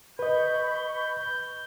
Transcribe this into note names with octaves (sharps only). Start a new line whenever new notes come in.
B4 D#5 B5 C#6 G6